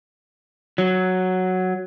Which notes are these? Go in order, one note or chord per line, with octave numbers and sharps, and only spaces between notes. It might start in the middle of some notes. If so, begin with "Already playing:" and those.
F#3